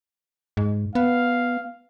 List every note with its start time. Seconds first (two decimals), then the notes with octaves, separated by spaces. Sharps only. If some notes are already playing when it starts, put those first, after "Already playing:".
0.57 G#2
0.95 B3 F5